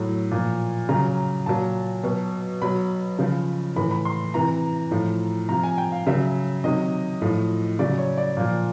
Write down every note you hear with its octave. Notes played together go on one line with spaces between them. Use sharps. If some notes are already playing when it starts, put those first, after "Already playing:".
Already playing: A2 F#3
A#2 F3
C#3 F#3 A#5
A#2 F#3 A5
B2 F#3
B2 F#3 B5
C#3 F3
A2 E3 B5
B5
C6
C3 E3 A#5
A2 F3
C3 F3 A#5
G#5
G5
F5
C#3 F#3 E5
C3 D#3 F#3 D#5
A2 F3
C#3 F#3 D5
C#5
D5
A#2 F3